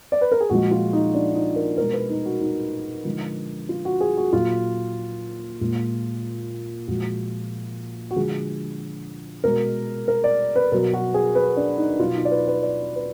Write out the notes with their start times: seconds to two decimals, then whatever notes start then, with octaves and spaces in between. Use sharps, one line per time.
0.12 D5
0.21 B4
0.32 A#4
0.40 G#4
0.50 A#2 F3 G#3 F#4
0.71 F4
0.93 D#4
1.14 D4
1.35 D#4
1.56 A#4
1.78 B2 G#3 A#4
1.93 B4
2.10 D#4
2.25 F#4
2.41 D#4
3.05 D3 F3 G#3
3.69 F4
3.85 F#4
4.01 G#4
4.17 F#4
4.33 A#2 F#3 F4
5.61 A#2 G#3
6.88 A#2 F3 G#3 F#4
8.11 F#4
8.16 D3 F3 G#3 G#4
9.44 B2 G#3 A#4
10.08 A#4
10.24 D5
10.56 B4
10.72 B2 F#3 A#4
10.94 F#4
11.14 G#4
11.35 B4
11.57 D4
11.78 D#4
11.99 B2 F#3 F4
12.15 D#4
12.25 D5
12.31 B4
12.48 B4
12.63 D5
12.96 B4